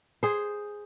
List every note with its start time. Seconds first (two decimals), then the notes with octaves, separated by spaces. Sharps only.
0.23 G#4 C5